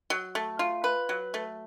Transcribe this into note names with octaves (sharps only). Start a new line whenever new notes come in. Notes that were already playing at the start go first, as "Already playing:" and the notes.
F#3
A3
F4
B4
F#3
A3